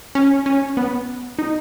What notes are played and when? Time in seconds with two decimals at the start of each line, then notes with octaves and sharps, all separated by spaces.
0.15 C#4
0.46 C#4
0.77 B3
1.39 D#4